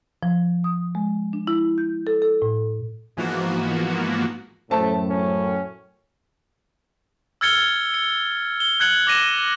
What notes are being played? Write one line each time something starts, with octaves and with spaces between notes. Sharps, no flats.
F3
D#6
G#3
D4
E4
G6
A4
A4
A2
G#2 E3 F3 A#3 B3 F#4
F#2 A2 A3 C5 A5
C#4
E6 F6 G#6 A6 C#7 G7
C#7
G7
F#6 G#6 C#7 F#7
D6 A#6 D#7 E7